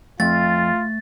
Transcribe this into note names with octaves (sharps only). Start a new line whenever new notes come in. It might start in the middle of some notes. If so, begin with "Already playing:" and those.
F2 A3 F4 A6